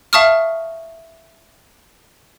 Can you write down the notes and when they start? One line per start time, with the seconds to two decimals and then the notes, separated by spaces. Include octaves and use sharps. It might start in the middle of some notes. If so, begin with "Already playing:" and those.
0.13 E5 F5 A5 C#6 D#6 F6